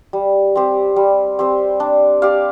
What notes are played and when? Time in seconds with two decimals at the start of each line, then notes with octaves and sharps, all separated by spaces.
0.13 G3
0.56 C4 G4 C5
0.96 G3
1.39 C4 G4 C5
1.80 D4
2.22 G4 D5 F5